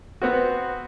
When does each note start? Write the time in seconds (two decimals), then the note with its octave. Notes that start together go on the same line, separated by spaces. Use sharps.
0.22 B3 C4 F#4